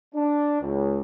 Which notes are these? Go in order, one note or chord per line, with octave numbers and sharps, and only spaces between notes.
D4
C#2